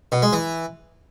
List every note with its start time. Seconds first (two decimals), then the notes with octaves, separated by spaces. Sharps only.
0.12 B2
0.22 G#3
0.33 E3